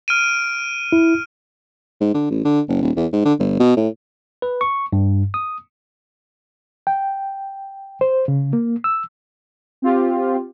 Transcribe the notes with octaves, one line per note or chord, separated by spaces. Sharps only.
F6 D7 D#7
E4
G#2
D3
A1
D3
F#1
D#1
E2
G#2
D3
G1
B2
A2
B4
C#6
G2
D#6
G5
C5
C#3
A#3
E6
C4 F4 G4